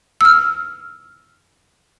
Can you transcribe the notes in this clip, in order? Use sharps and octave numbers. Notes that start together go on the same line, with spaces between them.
E6 F6